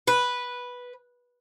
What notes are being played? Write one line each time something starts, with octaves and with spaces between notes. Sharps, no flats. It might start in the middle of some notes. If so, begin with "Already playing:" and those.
B4